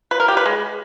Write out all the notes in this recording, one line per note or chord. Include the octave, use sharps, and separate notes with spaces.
B4
A#4
G4
B4
G#3